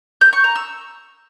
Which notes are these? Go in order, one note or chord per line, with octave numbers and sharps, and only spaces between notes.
G6
C#6
A#5
E6